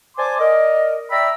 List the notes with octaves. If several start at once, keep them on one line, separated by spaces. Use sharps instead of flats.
C5 D5 G#5 A5 C6 D6
A#4 D5 D#5
D5 E5 G5 A#5 B5 E6